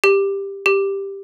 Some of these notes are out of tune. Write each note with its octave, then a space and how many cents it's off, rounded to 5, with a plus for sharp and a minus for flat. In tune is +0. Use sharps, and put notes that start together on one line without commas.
G4 +10
G4 +5